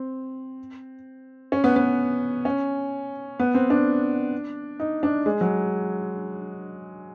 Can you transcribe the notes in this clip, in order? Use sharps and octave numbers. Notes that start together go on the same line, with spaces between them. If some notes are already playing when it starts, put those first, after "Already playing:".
Already playing: C4
C#4
B3
B3
C#4
B3
C4
D4
D#4
D4
G#3
F#3